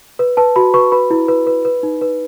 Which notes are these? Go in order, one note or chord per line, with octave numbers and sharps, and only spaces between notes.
B4
B4 A5
F#4 B5
B4 C#6
B4 B5
E4
B4
B4
B4
D#4
B4